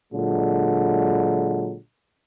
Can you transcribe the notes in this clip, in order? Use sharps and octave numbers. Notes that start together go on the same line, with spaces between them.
A#2 D3 F#3 G#3